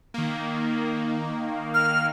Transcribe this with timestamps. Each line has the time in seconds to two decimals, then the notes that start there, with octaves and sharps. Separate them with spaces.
0.14 D#3 A#3
1.74 F6